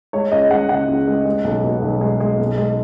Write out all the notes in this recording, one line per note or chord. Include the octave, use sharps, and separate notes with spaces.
G#3 C#5
C#2 D#5
G#3 F#5
C#3 F#5
C#2
G#3
G#3
B1
B2
B1
G#3
G#3
B1
G#3